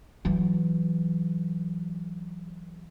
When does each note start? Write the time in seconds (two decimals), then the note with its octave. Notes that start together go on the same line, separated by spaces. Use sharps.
0.25 E3 F#3